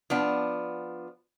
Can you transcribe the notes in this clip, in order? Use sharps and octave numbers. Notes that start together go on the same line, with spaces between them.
F3 B3 D4